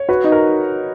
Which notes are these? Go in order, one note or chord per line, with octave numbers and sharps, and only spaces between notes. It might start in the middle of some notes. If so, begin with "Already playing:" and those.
Already playing: C#5
F#4 B4
D#4
A#4